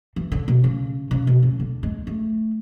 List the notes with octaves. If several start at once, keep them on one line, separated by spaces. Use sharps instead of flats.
E3
D3
B2
C#3
C#3
B2
C#3
D3
G#3
A3